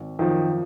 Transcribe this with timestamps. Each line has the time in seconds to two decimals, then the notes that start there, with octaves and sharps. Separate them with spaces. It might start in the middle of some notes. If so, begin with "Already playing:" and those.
Already playing: G#1
0.19 F#2 D#3 F3